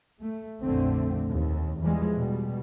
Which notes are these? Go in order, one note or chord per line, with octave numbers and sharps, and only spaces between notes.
A3
A#1 F2 D3 A3 C4
D#2
E2 E3 F3 G3 G#3
B2 G3